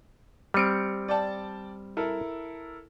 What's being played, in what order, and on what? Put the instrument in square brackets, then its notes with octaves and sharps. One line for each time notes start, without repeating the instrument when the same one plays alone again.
[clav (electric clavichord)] G3 C4 [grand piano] F6 C#7 D7
[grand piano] D5 G5 A5
E4 A4 A#4